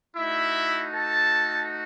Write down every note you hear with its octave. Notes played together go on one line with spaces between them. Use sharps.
A3 D#4 E4 F#4 E5
A4 A5